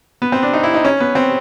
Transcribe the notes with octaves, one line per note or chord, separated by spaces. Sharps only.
B3
C4
D4
D#4
E4
D#4
C#4
B3
C4